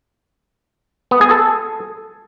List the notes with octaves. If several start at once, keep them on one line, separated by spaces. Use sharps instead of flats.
B3
G#4
A4